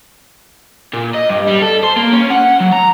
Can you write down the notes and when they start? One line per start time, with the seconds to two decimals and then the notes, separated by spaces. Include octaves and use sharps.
0.93 A#2
1.14 D#5
1.29 G2
1.47 G3
1.62 A4
1.83 C5
1.96 A#3
2.12 C#4
2.30 F#5
2.60 F#3
2.73 A#5